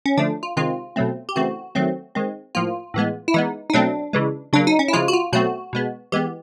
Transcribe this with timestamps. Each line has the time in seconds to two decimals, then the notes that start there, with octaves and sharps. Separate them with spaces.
0.06 C#4
0.17 D3 F3 A3 D4
0.43 F4
0.57 C3 D#3 G#3 C4 F4
0.96 B2 F#3 A3 C4
1.29 G4
1.36 C#3 E3 A3 C4 F#4
1.75 D#3 F#3 A3 C4
2.15 D#3 G#3 C4
2.55 A2 F3 A#3 F4
2.94 A2 E3 G#3 B3
3.28 E4
3.34 E3 G#3 B3 D#4
3.70 D#4
3.73 B2 F#3 A3 C4 D4
4.13 C#3 E3 G#3
4.53 C#3 F#3 A#3 D4
4.67 D#4
4.79 C#4
4.88 E4
4.93 C#3 F3 G#3 F4
5.08 F#4
5.13 F4
5.33 B2 F#3 A3 C4 F#4
5.73 B2 G#3 B3
6.12 E3 G#3 B3 G4